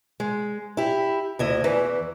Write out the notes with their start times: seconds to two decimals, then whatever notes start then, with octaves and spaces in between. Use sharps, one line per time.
0.20 G#3
0.77 E4 G4
1.39 D2 E4 D#5
1.64 E2 E3